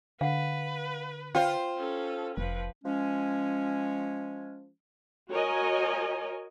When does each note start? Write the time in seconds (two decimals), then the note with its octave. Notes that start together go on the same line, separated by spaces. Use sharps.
0.21 D3 B4 F5 F#5
1.35 F4 C5 G5
1.78 C#4 A4
2.37 F1 F3 B4
2.83 F3 G#3 C#4
5.31 F#4 A#4 C#5 D#5 G#5